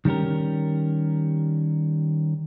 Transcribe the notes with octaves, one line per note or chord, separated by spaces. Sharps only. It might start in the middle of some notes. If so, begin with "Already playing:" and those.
D#3 G3 C#4 G4 A#4